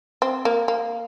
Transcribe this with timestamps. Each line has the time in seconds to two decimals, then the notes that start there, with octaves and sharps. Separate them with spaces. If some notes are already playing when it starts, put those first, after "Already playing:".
0.22 C4
0.45 A#3
0.68 A#3